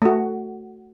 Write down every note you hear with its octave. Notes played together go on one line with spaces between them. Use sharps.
A3 F#4